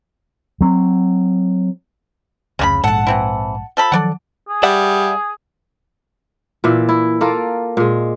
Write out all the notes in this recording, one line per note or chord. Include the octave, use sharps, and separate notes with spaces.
F#3 C4
F1 C#2 C#3 F#4 B5
A#1 G#2 A4 F#5 A5
E3 C4 E4
F3 A4 B5
D#3 F3 F#3 A4 D5 F#5
G#4
G3 D5 E5 F#5
A#2 E3 D5 E5
E4
A#3 F4 A4 A#4
A#2 G#3